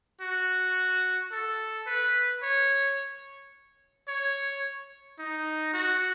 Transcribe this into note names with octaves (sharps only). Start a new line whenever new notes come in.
F#4
A4
B4
C#5
C#5
D#4
F#4